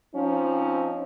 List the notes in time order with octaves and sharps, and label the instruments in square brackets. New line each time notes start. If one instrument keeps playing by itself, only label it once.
[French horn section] F3 C4 C#4 D#4